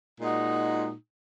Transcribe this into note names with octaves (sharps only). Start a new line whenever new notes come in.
A#2 G#3 D#4 F#4